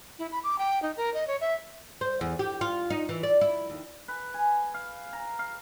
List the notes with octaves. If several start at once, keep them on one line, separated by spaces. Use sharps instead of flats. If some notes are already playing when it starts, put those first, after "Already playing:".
E4
B5
D6
G5
D#4
A#4
D#5
C#5
E5
C5
E2
G4
F4
D#4
E3
D5
E4
D#2
B4
G#5
F5
A#5
F5